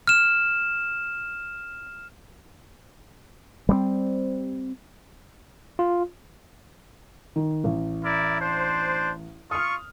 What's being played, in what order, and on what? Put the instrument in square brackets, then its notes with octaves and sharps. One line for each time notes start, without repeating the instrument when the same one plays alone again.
[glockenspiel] F6 E7
[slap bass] G3 A3 C4
[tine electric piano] F4
[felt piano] D#3
A1
[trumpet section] E4 A#4 D5
D4 C5
[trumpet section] F4 C#6 [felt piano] D#6 F6